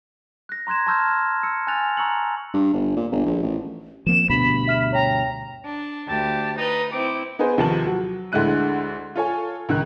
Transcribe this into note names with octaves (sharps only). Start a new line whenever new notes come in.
F#6 A#6
A#5 C6 F#6 G#6 E7
A5 C6 C#6 E6 F6 G6
E6 C#7
G#5 F6 F#6 A6 F7
A#5 C#6 E6 C#7 F#7
G2
G1
A#2
G1
A#1
A1
F3 A#3 C4 E7
D2 G2 B2 B5
E5 F6 E7
C#5 G5 A#5
D4
D2 G4 A5
D#4 B4
C4 E4 D6
B3 D#4 G#4 B4 C5
D#2 C3 F3 A#3 A5 F#7
F#3
D2 D3 G#3 E4 F#6 D#7
F4 A4 C#5 G#5
C#2 D#3 F#6